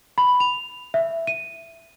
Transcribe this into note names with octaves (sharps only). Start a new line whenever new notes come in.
B5
F7
E5
D#7